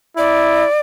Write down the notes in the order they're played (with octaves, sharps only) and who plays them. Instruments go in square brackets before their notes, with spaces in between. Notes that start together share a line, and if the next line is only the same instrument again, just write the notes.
[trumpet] E4 [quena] D5